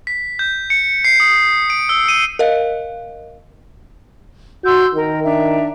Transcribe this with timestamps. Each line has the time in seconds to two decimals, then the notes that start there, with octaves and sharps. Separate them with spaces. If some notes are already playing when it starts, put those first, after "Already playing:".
0.07 B6
0.39 G6
0.70 C#7
1.05 C7
1.20 D#6
1.70 D7
1.89 E6
2.08 D#7
2.39 A#4 D#5 F5
4.64 F#4 C6 E6 G6
4.94 D#3 A#4
5.24 D4 E5 A#5